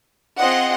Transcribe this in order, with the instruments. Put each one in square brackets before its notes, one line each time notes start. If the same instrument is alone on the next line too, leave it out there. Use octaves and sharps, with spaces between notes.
[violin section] C4 F4 G#4 D#5 F#5